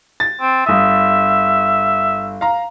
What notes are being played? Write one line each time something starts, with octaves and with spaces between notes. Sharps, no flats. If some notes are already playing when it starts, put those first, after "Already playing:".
A6
C4
G1 E5 D#6
F5 A#5